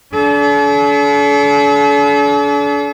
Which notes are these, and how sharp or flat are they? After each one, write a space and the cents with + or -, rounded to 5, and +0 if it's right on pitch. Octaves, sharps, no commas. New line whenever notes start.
D4 -40 A4 -45